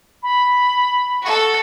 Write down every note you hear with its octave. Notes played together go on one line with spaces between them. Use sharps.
B5
F#4 A4